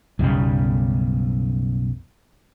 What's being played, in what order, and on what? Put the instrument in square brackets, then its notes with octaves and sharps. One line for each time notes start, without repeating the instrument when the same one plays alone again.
[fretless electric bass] B1 F#2 C#3 G3